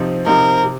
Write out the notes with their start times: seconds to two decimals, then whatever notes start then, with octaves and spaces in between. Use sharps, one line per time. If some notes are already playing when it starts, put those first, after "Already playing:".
Already playing: C3 F3 C4 D#4
0.26 C3 F3 C4 D#4 A#4
0.64 C3